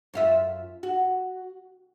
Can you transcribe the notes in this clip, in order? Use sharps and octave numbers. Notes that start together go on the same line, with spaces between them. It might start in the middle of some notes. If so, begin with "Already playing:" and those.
F#2 F4 E5
F#4